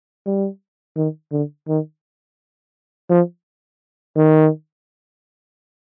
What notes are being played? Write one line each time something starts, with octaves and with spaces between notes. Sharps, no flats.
G3
D#3
D3
D#3
F3
D#3